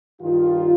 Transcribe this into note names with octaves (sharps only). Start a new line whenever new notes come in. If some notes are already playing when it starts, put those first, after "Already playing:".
G2 D#3 G3 F4